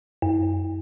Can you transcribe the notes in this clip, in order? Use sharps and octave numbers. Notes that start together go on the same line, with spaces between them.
F#2